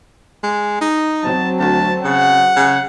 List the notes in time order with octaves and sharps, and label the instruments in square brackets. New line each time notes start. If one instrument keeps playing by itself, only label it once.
[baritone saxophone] G#3
D#4
[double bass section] F#3 C4 [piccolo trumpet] A5
[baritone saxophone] D2 [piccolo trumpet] A5
[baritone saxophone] C#3 [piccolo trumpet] F#5
[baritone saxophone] C#3